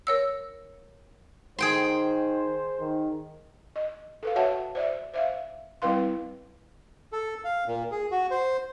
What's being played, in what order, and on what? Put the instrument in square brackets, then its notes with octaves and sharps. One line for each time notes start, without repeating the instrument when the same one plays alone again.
[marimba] A#4 C#5 E6
[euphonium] D#3 [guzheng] G#4 G5 C6 [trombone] C5
[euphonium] D#3
[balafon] D#5
A4 B4 F5
F#4 C#5 E5 F#5 A5
C5 D5 E5
C5 E5 F5
G3 C4 E4 B4 F5 C6
[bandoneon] A4
F5
A#2
G#4
F#4
C5